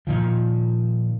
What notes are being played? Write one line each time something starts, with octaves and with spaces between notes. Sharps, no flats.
A#2 D#3 F3